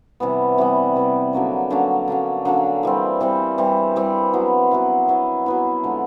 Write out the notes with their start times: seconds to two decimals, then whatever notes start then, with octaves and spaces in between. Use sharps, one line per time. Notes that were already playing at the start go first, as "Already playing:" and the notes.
0.20 C3 E3 G3 B3
0.58 C3 E3 G3 B3
0.95 C3 E3 G3 B3
1.33 D3 F#3 A#3 C#4
1.70 D3 F#3 A#3 C#4
2.08 D3 F#3 A#3 C#4
2.45 D3 F#3 A#3 C#4
2.83 E3 G3 C4
3.20 E3 G3 C4
3.58 E3 G3 C4
3.96 E3 G3 C4
4.33 F#3 B3 E4
4.71 F#3 B3 E4
5.08 F#3 B3 E4
5.46 F#3 B3 E4
5.84 D3 F3 G#3